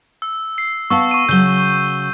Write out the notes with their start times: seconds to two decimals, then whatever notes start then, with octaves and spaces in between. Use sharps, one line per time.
0.22 E6
0.58 C7
0.90 B3 F5 A5 C#6 E6
1.11 C#6 D#7
1.29 C#3 F#3 G6 G7